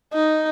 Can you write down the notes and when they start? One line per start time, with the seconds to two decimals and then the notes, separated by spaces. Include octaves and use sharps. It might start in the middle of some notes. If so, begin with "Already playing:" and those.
0.13 D#4